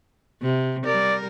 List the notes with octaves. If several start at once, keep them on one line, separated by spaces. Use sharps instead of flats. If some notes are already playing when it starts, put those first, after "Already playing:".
C3
G3 A#4 D5